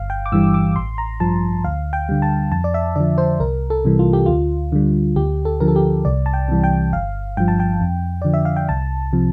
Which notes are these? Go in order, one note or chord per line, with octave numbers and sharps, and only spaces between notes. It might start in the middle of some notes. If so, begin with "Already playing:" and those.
Already playing: G1 F5
G5
D6
G2 E3 G3 E6
D6
A1 C6
A#5
G2 F3 A5
D2 F5
G5
D3 G3
A5
F2 A5
D5
E5
D3 F3 D5
C5
C2 A#4
A4
C3 E3 G3
F4
G4
D2 F4
D3 G3
D2 G4
A4
D3 F3 A#4
A4
G4
C2 D5
A5
G5
C3 E3 G3
G5
G1 F5
G2 F3 G5
A5
G5
F2
D3 F3 D5
E5
F5
G5
C2 A5
C3 F3